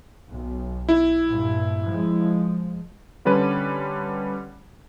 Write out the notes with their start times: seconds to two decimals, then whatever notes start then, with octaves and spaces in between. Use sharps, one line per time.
0.28 B1
0.89 E4
1.27 G2 A#2
1.88 F3 G#3
3.25 D3 G3 C#4 B4